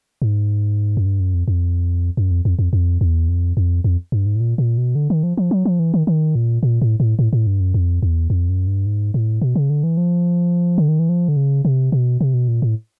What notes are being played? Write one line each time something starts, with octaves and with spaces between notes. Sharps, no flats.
G#2
F#2
G2
F#2
F2
F2
F#2
F2
F2
F2
F2
E2
F2
F2
F2
G2
G#2
A2
A#2
A#2
B2
D3
D#3
F3
F3
F#3
F3
E3
D#3
D#3
A#2
A#2
A2
A2
A2
A2
G2
F#2
F2
E2
F2
F#2
G2
G#2
A2
B2
C#3
D3
E3
F3
D3
D#3
E3
F3
D3
C#3
C3
B2
C3
B2
A#2
A2